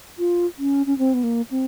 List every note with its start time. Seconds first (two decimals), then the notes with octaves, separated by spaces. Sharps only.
0.19 F4
0.58 C#4
0.86 C#4
0.98 C4
1.14 B3
1.23 A#3
1.51 C4